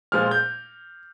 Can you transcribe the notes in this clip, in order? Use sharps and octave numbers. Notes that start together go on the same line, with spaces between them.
A#2 F3 G#3 F6
G6